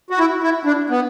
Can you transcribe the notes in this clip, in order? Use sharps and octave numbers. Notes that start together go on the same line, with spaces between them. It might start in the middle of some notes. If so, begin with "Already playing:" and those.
F#4
E4
E4
D4
B3